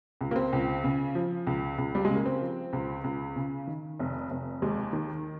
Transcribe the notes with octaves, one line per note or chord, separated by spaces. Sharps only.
C#2
A#3
C4
C#2
C#3
F3
C#2
C#2
G3
C#3 G#3
A#3
C4
F3
C#2
C#2
C#3
D#3
F1
F1
D#2 G#3
D#3